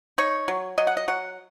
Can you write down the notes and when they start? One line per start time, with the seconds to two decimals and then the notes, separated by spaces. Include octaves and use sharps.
0.18 D#4 C#5
0.48 F#3
0.78 F#3 D#5
0.87 F#5
0.97 D#5
1.08 F#3 F#5